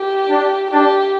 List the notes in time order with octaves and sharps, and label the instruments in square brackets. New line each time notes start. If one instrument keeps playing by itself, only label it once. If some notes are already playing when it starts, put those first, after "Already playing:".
Already playing: [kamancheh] G4
[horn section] D4
[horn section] D4 [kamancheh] G4